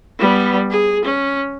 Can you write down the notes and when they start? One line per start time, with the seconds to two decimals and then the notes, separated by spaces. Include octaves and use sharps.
0.19 G3 B3
0.70 G#4
1.05 C#4